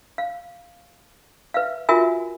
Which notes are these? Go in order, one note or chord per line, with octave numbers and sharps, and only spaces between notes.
F5
B4 E5 F5
F4 F#4 A#4 E5 G#5